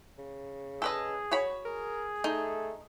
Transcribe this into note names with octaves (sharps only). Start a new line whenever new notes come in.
C#3
G#4 A4 B4 D#5
F#4 C#5 B5
G#4 A#4
A3 D#4